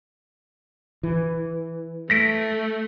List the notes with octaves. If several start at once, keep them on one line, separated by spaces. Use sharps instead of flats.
E3
A3 A#6 B6 D7